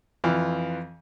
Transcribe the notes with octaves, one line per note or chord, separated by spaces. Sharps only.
F2 E3 F4 F5